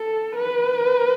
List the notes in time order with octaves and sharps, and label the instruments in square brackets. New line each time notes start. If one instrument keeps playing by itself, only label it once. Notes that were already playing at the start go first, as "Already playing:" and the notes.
Already playing: [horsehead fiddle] A4
B4